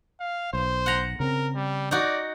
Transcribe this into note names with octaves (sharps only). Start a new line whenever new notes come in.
F5
B1 C5
F#5 A#5
C#3 C4 A#4
G3
D#4 F#4 D5